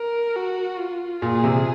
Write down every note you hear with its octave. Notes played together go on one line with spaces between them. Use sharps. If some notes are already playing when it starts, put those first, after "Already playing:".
Already playing: A#4
F#4
F4
A#2 G#4
C3